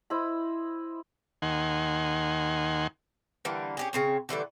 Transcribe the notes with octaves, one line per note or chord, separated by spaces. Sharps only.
E4 C5 D#5 B5
D#2 D#3 F#5 G#5 C6
D3 E3 G3 A#3
C#4 G4 G#4
C#3 C4 C#5
D3 E3 G3 A3